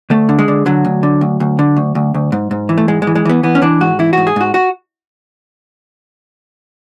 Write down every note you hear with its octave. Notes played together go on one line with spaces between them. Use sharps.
D2 A3
D3
G#3
D3
D3 F#3
D2
D3
D2
D2
D3
D2
D2
D2
G#2
G#2
E3
A3
G#2 G#3
G#3
E3
G#3
E3 B3
E3 B3
C#4
E3 D4
G#2 F#4
E3 E4
G#2 F#4
G#4
G#2 F#4
F#4